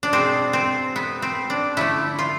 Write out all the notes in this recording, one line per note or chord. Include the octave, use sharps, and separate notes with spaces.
D4
B2 G#3 C4
C4
B3
C4
D4
D3 F3 A3 E4
F4